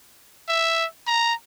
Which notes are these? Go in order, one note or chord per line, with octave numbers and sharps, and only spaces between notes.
E5
A#5